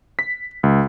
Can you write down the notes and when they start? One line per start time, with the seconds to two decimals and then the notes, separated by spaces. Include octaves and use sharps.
0.19 B6
0.63 C#2